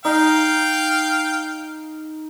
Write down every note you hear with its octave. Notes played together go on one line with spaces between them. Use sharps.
D#4 F5 G5